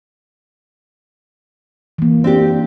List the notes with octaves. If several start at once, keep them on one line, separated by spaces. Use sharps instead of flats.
E3 A#3
C4 D4 G4